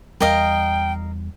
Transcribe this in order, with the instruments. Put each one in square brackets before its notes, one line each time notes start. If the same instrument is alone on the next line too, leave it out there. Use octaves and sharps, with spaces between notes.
[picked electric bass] E2 G3 [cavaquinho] A#4 D#5 F5 [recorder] G5